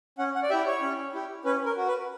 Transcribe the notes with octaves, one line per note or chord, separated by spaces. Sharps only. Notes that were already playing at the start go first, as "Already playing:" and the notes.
C#4 F#5
F#5
D5
E4 G4 E5
C#5
C#4
E4 G4
C#4 B4
A#4
F#4
B4